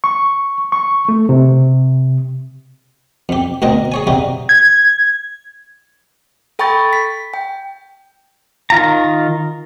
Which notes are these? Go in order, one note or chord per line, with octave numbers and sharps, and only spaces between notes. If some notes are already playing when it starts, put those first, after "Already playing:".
C#6
C#6
A3
C3
F2 G4
D2 B2 C4 A#4 D#5
G#4 C#5 G#5
C3 G3 D#4 F#4
G#6
A4 G5 B5 C#6 A6
B6
G5
D#3 F4 A#5